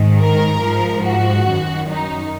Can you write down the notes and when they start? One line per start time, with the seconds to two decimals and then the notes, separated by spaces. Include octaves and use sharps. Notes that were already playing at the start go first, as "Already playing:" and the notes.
Already playing: G#2 D#3
0.19 A#4
0.62 G#2 F3
1.05 F#4
1.47 F#2 D#3
1.89 D#4